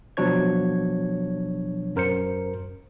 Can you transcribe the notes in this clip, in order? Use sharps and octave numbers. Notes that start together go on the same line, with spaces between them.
B2 F3 F#3 D4 C#5 G#6
F#2 A#4 C5 C#7